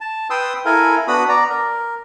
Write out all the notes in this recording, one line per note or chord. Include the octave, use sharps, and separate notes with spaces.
A5
B4 G5 C6 D#6 E6
E4 A4 A#4 F5 G#5
B3 D4 F#4 B5 D#6
D5 A#5
A#4